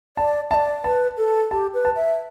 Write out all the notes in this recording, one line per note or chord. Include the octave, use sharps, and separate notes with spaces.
D5 A5
D5 E5 A5
B4 A5
A4
G4 A5
B4
A5
E5